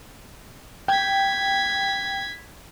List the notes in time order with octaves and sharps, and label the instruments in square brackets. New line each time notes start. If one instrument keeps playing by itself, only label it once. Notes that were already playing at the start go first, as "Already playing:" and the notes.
[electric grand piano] G5 [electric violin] G#6 B6